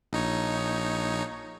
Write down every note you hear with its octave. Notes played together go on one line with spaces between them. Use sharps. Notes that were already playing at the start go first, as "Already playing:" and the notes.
A#1 D#4 C#5